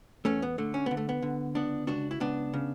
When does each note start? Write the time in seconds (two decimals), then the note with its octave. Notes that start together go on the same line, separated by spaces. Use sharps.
0.25 E2 A3 C#4
0.42 B3
0.58 D3 A3
0.74 C#4
0.86 D3 B3
0.97 A3
1.09 B3
1.22 D3
1.55 C#2 B3 D4
1.87 C#2 D4 F#4
2.11 E4
2.20 C#2 B3 D4
2.53 C#3